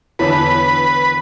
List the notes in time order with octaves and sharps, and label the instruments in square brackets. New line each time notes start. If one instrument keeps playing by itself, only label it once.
[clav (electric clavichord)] E2 D3 A5 [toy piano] E4 C#5 [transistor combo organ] B4